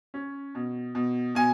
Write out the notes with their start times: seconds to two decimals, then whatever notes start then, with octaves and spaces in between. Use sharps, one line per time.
0.14 C#4
0.55 B2
0.95 B2
1.35 B2 G#5